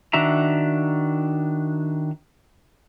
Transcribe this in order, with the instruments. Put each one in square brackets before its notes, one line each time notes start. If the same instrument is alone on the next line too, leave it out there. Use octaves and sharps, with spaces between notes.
[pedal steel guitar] D#3 D4 F#4 E5 A#5